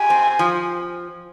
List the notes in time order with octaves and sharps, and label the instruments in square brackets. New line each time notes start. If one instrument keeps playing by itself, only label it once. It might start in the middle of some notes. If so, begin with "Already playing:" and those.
Already playing: [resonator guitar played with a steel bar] G4 [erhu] G#5
[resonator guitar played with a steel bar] C4
F3